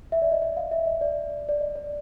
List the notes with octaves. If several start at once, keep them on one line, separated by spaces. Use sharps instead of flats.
E5
D5
D#5
D#5
F5
E5
D#5
D5
D5
D#5
D5